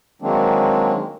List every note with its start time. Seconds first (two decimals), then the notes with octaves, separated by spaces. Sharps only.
0.22 D#3 F#3 G#3 A#3 C4 D4